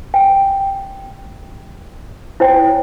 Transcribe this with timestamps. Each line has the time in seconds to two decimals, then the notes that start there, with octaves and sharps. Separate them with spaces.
0.14 G5
2.40 E4 C5 C#5 G5